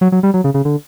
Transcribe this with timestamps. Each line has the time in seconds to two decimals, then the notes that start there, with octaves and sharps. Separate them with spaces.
0.01 F#3
0.12 F#3
0.23 G3
0.34 F#3
0.44 C#3
0.54 C#3
0.65 D3